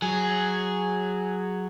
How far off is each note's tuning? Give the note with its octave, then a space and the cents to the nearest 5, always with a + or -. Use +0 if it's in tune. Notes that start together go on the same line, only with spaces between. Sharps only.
F#3 +0 G#4 +0